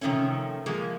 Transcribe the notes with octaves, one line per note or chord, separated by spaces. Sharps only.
C3 D#3 F3 A3 C#4
F3 G#3 A#3